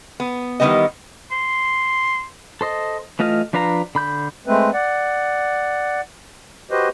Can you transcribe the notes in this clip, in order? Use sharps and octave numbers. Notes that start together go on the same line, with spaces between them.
B3
D#3 E3 G3 B3 G4 D#5
C6
A4 C5 D#5
E3 A3 F4 D#5 F6
F3 D4 B4 F5 A#5
D3 B5 G6
G#3 A3 C4 B4
D5 F#5
F#4 G4 B4 C5 D#5